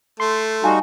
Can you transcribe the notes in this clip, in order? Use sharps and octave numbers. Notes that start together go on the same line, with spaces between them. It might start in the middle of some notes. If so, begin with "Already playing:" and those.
A3 C6
G3 D#4 F#4 F5 G#5 A5